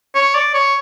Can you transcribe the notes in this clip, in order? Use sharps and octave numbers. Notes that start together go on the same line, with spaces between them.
C#5
D5
C#5